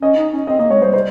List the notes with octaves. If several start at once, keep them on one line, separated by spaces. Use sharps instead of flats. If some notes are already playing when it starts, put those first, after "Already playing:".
C#4 D#5
D#4
C#4
C4 D#5
A#3 D#5
G#3 C#5
G3 C5
C5